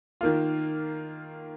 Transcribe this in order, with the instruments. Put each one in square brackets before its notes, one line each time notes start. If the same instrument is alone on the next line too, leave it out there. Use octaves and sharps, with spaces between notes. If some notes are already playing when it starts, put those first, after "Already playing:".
[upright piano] D#3 A#3 F4